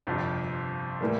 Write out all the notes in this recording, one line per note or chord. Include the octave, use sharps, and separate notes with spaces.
G1 F2 C3 F3
A2 E3 G3 A#3